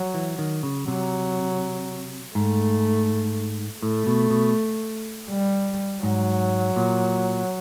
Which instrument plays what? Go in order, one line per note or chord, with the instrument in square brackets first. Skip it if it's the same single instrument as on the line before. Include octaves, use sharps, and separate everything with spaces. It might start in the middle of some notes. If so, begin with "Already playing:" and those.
Already playing: [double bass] F#3
[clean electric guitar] E3
D#3
C#3
[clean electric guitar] C3 [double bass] F#3
[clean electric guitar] G#2 [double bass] A3
[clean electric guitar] A2 [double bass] A3
[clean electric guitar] B2
B2
[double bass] G3
[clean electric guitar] G#2 [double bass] F#3
[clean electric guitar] A#2